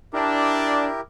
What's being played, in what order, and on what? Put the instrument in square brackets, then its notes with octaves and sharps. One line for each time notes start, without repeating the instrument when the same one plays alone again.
[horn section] D4 [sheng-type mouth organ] E4 G4 A#4